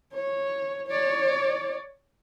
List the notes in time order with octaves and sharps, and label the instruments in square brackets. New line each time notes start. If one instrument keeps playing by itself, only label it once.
[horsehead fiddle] C#5
C#5 D5